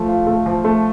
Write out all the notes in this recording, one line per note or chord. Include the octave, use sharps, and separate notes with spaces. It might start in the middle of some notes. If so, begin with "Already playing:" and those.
Already playing: F3 A3
F4
A3
F3
A3